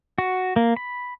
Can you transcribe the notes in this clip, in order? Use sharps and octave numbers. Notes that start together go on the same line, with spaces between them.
F#4
A#3
B5